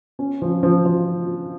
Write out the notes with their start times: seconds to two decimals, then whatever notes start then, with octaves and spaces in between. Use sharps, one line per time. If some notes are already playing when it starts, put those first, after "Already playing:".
0.19 C#4
0.42 F3
0.63 F3
0.85 F3